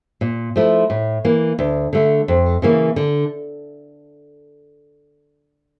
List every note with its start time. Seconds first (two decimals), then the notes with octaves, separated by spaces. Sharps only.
0.21 A#2
0.56 F3 A3 E4
0.90 A2
1.25 E3 A#3
1.59 D2
1.93 D3 A3
2.28 F2
2.62 C#3 E3 A#3
2.96 D3